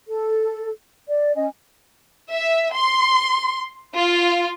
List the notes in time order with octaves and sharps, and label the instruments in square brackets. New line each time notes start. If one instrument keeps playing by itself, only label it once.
[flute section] A4
D5
C#4 D#5 G#5
[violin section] E5
C6
F4